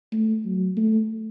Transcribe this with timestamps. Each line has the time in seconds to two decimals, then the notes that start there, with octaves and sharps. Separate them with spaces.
0.12 A3
0.45 F#3
0.77 A3